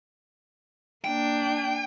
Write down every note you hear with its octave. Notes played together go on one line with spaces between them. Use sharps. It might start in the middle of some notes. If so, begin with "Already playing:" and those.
A#3 D4 G5